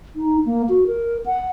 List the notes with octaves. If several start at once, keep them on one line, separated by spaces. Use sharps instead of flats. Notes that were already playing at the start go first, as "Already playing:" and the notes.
D#4
A#3
F#4
A#4
F#5